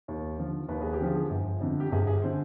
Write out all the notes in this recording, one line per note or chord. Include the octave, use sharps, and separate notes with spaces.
D#2
D3 F3
D#2 B4
G#4
G4
D3 F3 G#4
G1
F2 D3
G4
G1 G#4
G#4
D3 C5